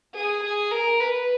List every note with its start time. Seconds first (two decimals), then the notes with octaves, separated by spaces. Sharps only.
0.14 G#4
0.43 G#4
0.71 A#4
1.00 B4